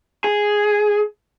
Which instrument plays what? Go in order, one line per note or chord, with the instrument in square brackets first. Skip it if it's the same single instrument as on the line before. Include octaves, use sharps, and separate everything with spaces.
[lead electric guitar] G#4